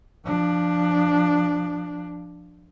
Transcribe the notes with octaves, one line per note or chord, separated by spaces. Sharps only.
F3 D4